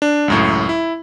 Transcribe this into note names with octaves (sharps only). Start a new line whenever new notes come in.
D4
C#2 F#2 A2
E4